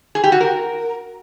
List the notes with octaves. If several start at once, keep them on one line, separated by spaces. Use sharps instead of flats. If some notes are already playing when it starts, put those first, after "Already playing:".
G#4
G4
F#4
A#4